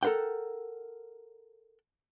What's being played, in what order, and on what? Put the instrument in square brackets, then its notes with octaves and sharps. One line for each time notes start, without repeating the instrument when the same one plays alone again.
[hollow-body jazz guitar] A4 A#4 C5 F#5 G5